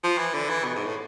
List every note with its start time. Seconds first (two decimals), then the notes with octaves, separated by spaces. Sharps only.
0.04 F3
0.18 E3
0.34 D3
0.49 E3
0.65 B2
0.76 G#2
0.85 A2